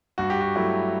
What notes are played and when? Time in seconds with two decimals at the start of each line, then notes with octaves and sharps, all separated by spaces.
0.18 G2 F#4
0.30 G4
0.41 F#4
0.56 F#3 A3 E4